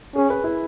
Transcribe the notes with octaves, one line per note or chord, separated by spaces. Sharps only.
C#4 G#4
B4
E4